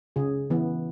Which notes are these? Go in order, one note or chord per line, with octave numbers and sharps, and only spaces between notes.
C#3 G#4
E3 B3